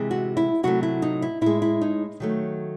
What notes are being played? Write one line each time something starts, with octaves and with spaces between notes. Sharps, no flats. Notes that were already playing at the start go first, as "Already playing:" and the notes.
Already playing: C3 E3 G#3
F#4
E4
C3 F#3 A3 F#4
E4
D#4
E4
A2 G#3 E4
E4
D#4
D#3 F#3 A3